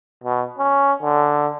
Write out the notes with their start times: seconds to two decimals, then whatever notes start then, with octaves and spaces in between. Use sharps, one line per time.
0.24 B2
0.58 C#4
1.03 D3